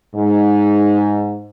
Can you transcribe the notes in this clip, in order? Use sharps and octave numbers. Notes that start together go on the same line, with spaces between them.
G#2